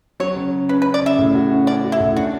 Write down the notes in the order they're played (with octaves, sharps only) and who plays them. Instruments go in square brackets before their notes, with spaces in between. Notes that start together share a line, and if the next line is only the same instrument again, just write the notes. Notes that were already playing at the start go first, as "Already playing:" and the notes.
[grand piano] F#3 [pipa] C#5
[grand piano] C#3
C#3
[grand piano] C#4 [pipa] B4
[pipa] B4
[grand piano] C#4
[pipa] D5
[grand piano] C#3 [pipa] E5
[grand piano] A2
F#4
C#4
[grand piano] C#4 [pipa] D5
[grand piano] F#4
[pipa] E4
[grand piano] A2
[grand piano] D4 [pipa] F#4